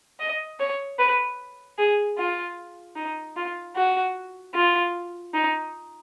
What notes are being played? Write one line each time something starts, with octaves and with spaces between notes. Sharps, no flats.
D#5
C#5
B4
G#4
F4
D#4
F4
F#4
F4
D#4